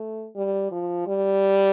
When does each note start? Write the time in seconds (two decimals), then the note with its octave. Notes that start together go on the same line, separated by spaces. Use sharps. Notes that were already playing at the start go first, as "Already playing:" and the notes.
Already playing: A3
0.36 G3
0.72 F3
1.07 G3